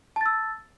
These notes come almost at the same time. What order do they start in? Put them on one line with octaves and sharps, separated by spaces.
A5 A6 E6